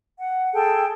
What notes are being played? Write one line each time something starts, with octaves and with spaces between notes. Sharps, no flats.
F#5
G#4 A4 G5 A5